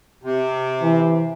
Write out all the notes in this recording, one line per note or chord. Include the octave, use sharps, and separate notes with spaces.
C3
E3